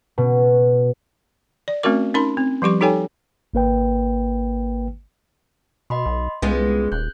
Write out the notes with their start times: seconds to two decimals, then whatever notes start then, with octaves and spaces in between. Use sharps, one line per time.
0.18 B2
1.68 D5
1.83 A3 C4 C#4 F#4 A#4 D6
2.14 C#4 D#4 A#4 B5 C6
2.37 C4
2.62 F3 G3 G4 C#6
2.81 D#4 G4 A4 C#5 G5 G#5
3.54 G#1 A#3 B4 G5
5.90 B2 D#5 B5 C6
6.06 B1
6.42 C2 G#3 B3 C#4 F4 G#4 B4
6.92 D#1 F#6 G6